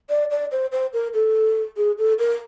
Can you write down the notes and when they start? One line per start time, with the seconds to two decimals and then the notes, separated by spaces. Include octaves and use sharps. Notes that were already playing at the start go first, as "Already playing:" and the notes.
0.10 D5
0.31 D5
0.52 C5
0.72 C5
0.93 A#4
1.14 A4
1.77 G#4
1.98 A4
2.19 A#4